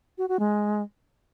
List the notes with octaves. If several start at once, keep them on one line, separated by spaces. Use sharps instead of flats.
F#4
F#4
G#3